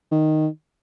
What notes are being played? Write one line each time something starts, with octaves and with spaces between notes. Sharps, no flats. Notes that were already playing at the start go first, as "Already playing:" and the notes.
D#3